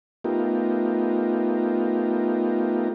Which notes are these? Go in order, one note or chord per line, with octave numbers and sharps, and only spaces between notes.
A3 B3 D#4 F4 G4 A#4